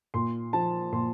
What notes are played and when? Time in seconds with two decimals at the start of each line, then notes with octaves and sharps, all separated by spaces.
0.14 A#2 C6
0.53 F3 A5
0.92 A#2 C6